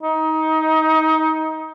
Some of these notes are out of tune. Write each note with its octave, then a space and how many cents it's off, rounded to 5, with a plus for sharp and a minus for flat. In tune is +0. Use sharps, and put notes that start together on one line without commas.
D#4 +20